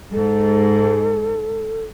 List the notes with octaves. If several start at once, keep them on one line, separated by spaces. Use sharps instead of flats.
G#2 A4